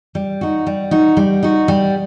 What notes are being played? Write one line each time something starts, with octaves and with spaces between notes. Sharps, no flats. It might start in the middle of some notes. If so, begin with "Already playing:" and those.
G3
D#4 F#4
G3
D#4 F#4
G3
D#4 F#4
G3